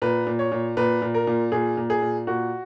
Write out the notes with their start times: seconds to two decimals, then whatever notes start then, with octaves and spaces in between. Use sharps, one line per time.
0.02 A#2 B4
0.27 A#2
0.39 C#5
0.52 A#2
0.77 A#2 B4
1.02 A#2
1.14 A#4
1.27 A#2
1.52 A#2 G#4
1.77 A#2
1.90 G#4
2.02 A#2
2.27 A#2 F#4